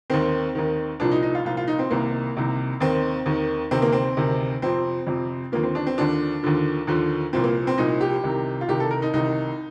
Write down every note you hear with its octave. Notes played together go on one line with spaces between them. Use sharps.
D#2 D#3 C4
D#2 D#3
C2 A#2 F3 D4
D#4
D#4
F4
C2 A#2 F3 F4
F4
D#4
C4
C2 C3 D#3 A#3
C2 C3 D#3
D#2 D#3 C4
D#2 D#3
D2 C3 D#3 C4
A#3
C4
D2 C3 D#3
F2 C3 F3 C4
F2 C3 F3
D#2 D3 F3 A#3
C4
D4
C4
D#2 D3 F3 D4
D#2 D3 F3
D#2 D3 F3
C2 A#2 F3 C4
A#3
C4
C2 A#2 F3 D#4
G4
C2 C3 D#3
F4
C2 C3 D#3 G4
A4
A#4
D#4
C2 C3 D#3 D#4